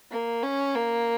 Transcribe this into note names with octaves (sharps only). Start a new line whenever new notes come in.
A#3
C#4
A#3